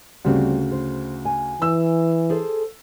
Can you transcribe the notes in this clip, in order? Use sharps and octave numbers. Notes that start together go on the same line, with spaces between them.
D2 C#3 G3 C4
C5
G#5
E3 E6
G#4 A4 C5